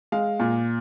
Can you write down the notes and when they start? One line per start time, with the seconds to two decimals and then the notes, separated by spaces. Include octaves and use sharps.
0.12 G#3 F5
0.40 A#2